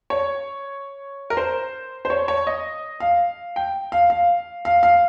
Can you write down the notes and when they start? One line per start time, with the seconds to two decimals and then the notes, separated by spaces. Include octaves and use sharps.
0.10 C#5
1.30 A#4
1.37 C5
2.05 C5
2.10 C#5
2.28 C#5
2.47 D#5
3.00 F5
3.56 G5
3.92 F5
4.10 F5
4.65 F5
4.83 F5